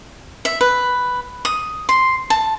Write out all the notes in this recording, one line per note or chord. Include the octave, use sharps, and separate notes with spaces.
E5
B4
D#6
C6
A5